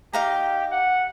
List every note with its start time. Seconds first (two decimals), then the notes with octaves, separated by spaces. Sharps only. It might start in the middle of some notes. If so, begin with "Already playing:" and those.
0.13 D#4 G4 F5 A#5
0.72 F#5